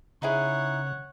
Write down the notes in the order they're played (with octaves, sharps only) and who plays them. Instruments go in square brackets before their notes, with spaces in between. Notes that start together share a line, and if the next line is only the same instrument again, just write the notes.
[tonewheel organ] C#3 [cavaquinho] D#4 E4 G#4 [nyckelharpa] C#5 F#5